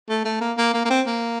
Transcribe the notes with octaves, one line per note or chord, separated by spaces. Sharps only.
A3
A3
A#3
A#3
A#3
A#3
C4
A#3